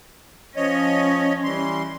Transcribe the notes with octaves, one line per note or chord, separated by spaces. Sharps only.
F3 C#4 C#5 D#5
E3 G3 C6